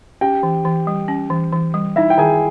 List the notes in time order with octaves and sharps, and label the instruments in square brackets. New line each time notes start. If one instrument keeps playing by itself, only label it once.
[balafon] C#4 [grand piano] G4 G5
[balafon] E3
E3
G3
C#4
E3
E3
G3
[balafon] D#4 [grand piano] E4 E5
[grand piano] G5
[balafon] D#3 [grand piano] G#4 G#5